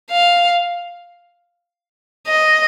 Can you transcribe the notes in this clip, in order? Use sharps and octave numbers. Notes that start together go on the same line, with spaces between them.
F5
D#5